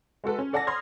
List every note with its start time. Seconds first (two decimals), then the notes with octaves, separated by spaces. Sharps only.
0.24 G#3 F#4 A4 B4
0.39 C#4
0.53 A4 D5 F#5 G#5 A5 A#6
0.67 B5 C6 D#6 F6 G#6